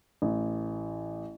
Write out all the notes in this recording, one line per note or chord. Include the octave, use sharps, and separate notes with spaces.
A1